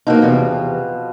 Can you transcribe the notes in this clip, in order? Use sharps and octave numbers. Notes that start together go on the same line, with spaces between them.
B2 F3 A#3 D#4
E2 C3